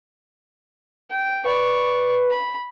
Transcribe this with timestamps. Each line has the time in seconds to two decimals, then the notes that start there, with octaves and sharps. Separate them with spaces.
1.10 G5
1.44 B4 D5 C#6
2.30 B5